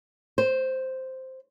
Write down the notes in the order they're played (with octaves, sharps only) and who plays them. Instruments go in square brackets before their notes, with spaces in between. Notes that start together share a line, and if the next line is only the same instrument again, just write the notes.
[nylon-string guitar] C5